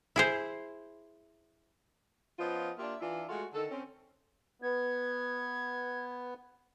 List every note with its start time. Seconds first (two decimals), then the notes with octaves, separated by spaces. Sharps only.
0.16 E4 G#4 C5
2.39 F3 B3 C#4 F4 D#5
2.78 A#3 D4 F4 G4 E5
3.01 E3 D4 E4 F4
3.29 G#3 A3 F4 F#4
3.54 D3 D#3 A4
3.71 C4 C#4
4.62 B3 G#6